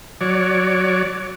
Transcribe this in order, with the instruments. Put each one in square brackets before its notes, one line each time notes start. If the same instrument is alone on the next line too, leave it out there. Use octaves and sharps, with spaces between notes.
[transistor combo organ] F#3 C#5 D5